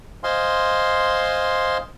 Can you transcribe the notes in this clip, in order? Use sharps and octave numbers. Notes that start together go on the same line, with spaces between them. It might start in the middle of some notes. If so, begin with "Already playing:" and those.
C5 D#5 F5 G#5 C6